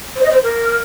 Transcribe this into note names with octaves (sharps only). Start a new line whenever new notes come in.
C5
D#5
C5
A#4